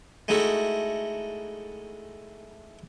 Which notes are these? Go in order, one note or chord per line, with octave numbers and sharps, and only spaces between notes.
G#3 A3 D#4 E4 F#4 A4